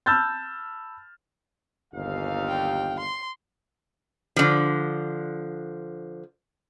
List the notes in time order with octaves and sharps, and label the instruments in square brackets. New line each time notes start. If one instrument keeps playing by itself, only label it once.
[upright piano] A5 B5 E6 F6 G6 A6
[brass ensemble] G1 D#2 F5
[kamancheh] G5
C6
[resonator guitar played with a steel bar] D3 F3